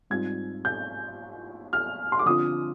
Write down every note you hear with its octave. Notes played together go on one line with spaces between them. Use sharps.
G#2 G3 C4 F4 G#6
G6
F6
C6
D6
D3 F3 C4 F4 D#6